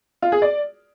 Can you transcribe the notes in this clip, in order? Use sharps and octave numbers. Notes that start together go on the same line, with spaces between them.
F4
G#4
D5